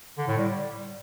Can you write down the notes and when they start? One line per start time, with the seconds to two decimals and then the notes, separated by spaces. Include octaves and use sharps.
0.18 D3
0.28 A2
0.38 G3